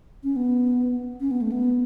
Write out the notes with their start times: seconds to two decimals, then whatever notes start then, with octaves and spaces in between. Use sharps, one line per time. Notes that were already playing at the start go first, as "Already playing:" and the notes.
0.24 C#4
0.36 B3
1.20 C#4
1.31 B3
1.42 A3
1.52 B3